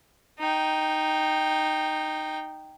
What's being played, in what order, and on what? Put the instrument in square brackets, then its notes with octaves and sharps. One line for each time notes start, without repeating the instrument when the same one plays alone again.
[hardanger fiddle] D#4 G5